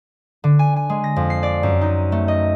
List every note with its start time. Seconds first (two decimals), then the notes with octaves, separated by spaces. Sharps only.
0.44 D3
0.59 G#5
0.76 G#5
0.90 G#3
1.04 A#6
1.16 F2
1.30 C7
1.43 D5
1.63 F#2
1.81 D#4
2.12 A3
2.28 D#5